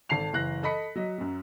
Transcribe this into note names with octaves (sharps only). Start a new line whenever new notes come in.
G#1 A4 A5 C7 F7
F#1 E3 F#6 A#6
A4 D#5 B5 B6 C#7
F#3 D#5
F#2 F#3